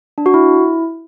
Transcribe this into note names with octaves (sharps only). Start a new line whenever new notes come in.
D4
F#4
E4